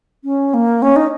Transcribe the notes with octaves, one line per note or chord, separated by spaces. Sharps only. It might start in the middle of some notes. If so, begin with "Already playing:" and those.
C#4
A#3
C#4
D#4